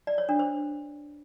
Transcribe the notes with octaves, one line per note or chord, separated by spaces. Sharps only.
D5
C#5
D4
C5